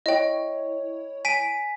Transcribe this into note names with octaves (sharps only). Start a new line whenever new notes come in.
E4 C#5 D#5 G5
G#5 B6 D7 D#7